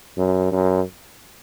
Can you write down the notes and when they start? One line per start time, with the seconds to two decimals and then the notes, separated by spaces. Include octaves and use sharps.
0.17 F#2
0.52 F#2